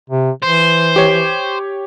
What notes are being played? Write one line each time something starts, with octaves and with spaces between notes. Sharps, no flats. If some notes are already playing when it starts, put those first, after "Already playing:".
C3
E3 C5
G4 C#5